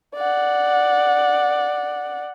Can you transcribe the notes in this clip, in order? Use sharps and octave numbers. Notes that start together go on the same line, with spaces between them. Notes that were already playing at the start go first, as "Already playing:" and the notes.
D5 F#5